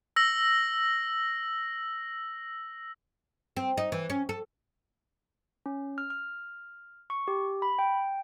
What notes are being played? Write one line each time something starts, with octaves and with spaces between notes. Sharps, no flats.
E6 A#6 F#7
C4
D#4
E3
C#4
A4
C#4
F6
F6
C#6
G4
B5
G5